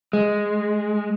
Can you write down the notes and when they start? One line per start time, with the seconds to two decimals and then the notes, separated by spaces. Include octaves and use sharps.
0.13 G#3